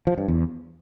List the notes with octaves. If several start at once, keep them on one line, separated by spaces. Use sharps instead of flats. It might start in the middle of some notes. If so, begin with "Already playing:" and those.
F3
G2
E2